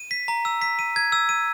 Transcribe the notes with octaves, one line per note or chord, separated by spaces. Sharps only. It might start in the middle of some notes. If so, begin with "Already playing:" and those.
Already playing: D#7
B6
A#5
E6
B6
D#7
G#6
E6
D#7